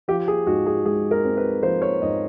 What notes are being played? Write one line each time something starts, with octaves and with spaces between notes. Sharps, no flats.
F3 G4
G#4
G#2 F#4
G#4
G#3 G#4
A#4
C4
B4
F3 C5
C#5
G#2 D#5